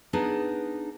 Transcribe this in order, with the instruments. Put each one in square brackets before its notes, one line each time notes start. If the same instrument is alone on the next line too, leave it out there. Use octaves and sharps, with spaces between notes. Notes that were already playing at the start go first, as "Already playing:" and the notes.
[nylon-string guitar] B3 D4 D#4 G#4